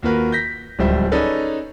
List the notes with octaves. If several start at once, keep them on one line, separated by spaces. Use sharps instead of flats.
D#2 A#3 F4 F#4 A#4 B4
G6 A#6 B6
D1 C#2 F3 G3 C5 E5
C#4 D#4 G#4 A4 B4 D5